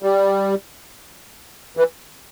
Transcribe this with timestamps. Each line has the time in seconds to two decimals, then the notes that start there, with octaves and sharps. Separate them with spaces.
0.03 G3
1.77 E3